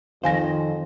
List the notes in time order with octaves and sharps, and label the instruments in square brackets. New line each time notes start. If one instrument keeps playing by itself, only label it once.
[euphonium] F2 [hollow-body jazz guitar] D#3 C5 [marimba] F5 G#5 A#6